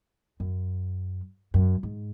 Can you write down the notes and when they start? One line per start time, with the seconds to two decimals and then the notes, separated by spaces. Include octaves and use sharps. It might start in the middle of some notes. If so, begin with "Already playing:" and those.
0.40 F#2
1.54 F#2
1.83 G#2